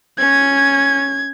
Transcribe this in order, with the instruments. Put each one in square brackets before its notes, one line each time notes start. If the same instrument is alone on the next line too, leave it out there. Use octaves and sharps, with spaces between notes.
[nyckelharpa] C#4 [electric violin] G#6